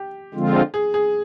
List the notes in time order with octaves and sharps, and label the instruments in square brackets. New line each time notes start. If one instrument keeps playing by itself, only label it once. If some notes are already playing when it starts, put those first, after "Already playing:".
Already playing: [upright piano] G4
[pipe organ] D3 F3 G#3 C4 F4
[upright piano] G#4
G#4